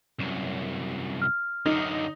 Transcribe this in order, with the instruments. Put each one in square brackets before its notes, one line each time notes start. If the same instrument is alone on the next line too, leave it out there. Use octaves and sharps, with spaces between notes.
[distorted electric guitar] C2 F#2
[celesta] F6
[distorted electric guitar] F#2 D3 [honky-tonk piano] D#4